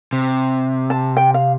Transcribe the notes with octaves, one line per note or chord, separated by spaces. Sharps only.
C3
A5
G5
F5